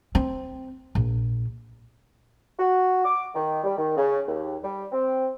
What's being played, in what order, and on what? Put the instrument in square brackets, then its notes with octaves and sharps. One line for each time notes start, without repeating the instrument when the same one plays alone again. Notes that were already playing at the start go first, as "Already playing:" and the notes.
[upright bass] C4
A#1
[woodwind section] F#4
D6
D#3
G3
D#3
C#3
D#2
G3
C4